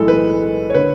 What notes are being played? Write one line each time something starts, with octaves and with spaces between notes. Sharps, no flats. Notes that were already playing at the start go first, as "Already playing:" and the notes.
Already playing: B1 A2 E3 G#3 A4
B4
C#5
D3 B4